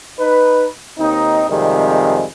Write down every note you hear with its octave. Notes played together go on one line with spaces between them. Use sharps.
D#4 B4
D#2 C4 D#4
F2 C3 D#3 G3 G#3